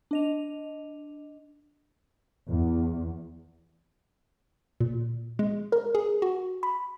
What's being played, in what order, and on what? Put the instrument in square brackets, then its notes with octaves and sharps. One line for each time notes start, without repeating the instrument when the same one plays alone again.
[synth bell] D4 D#5 F7
[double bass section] E2
[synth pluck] A#2
G#3
A#4
G#4
F#4
B5